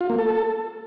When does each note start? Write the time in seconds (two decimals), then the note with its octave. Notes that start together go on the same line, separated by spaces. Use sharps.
0.01 F4
0.10 A#3
0.18 A4